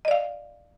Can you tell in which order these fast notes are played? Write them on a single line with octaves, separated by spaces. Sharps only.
D#5 D5 F5